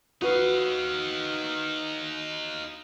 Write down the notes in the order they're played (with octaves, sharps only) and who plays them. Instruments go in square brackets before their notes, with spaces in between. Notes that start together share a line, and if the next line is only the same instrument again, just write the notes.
[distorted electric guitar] D#4 F5 [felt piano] F#4 B4